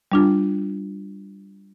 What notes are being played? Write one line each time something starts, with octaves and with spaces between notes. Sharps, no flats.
G3 D4 F4